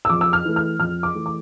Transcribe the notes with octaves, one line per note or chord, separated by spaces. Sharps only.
E6
F2 D6
E6
F6
E3 A3
F6
F2 F6
D6
E3 A3
D6